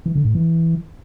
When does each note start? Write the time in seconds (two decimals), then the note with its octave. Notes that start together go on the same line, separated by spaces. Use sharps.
0.06 E3
0.15 D3
0.25 A2
0.35 E3